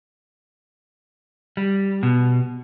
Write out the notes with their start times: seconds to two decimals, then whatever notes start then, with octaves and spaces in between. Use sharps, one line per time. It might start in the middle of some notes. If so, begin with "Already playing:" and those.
1.57 G3
2.03 B2